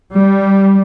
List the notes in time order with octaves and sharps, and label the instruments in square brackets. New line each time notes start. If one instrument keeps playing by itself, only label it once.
[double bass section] G3